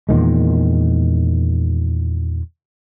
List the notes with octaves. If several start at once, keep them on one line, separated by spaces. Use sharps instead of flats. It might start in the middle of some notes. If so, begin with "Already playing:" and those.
E2 A#2 D#3 G#3